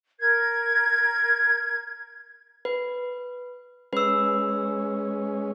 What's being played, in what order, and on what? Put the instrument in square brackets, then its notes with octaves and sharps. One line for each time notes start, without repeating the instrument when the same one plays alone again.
[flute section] A#4 G#6
[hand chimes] B4
[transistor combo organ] G#3 C#4 [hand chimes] B4 E6